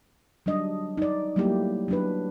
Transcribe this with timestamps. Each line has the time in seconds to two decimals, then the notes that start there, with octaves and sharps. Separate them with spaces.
0.46 F#3 G3 D4 D#5
0.97 D#4 D5
1.36 F#3 G3 A3 A#3 E4 G4
1.88 F#3 D4 B4